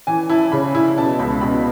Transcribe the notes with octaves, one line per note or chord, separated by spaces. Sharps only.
E3 G#5
E4 A5
C#3 B5
E4
B2 A5
C#2 B5
B2 B5